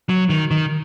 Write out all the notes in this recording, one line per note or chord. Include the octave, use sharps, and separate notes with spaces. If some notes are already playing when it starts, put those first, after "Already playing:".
F#3
D#3
D#3